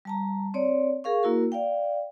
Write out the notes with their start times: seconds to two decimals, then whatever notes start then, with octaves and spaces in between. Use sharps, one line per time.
0.05 G3 A5 A#5
0.54 C4 C#5 D5
1.04 G#4 A#4 F5 C#6
1.23 A#3 E4 F#4 A#4
1.52 D5 F5 G5